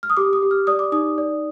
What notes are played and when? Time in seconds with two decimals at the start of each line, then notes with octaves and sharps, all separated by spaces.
0.03 F6
0.10 D#6
0.17 G4 D6
0.33 D#6
0.42 G4
0.51 F6
0.67 D5 D#6
0.79 D6
0.92 D#4 D#6
1.18 D5